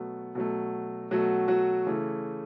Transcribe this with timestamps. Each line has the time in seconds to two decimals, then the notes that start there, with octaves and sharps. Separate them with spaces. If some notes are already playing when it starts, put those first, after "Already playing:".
Already playing: B2 F#3 A3 B3
0.35 B2 F#3 A3
1.11 B2 F#3 A3 F#4
1.48 F#3 F#4
1.87 C#3 E3 A3